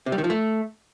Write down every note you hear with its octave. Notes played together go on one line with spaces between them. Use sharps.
C3
G3
D#3
F3
A3